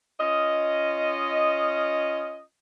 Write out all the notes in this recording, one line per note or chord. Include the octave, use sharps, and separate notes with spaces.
C#4 F4 D#5